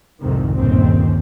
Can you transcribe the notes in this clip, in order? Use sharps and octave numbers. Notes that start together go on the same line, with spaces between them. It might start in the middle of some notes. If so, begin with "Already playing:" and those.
C2 F2 G#2 C3 D#3
G1 D#2 A#2 C#3 C4